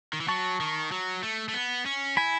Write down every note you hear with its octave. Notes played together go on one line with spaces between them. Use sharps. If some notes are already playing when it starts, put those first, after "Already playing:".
D#3
E3
F#3 A5 C#6
D#3
F#3
A3
A3
B3
C#4
E4 G#5 B5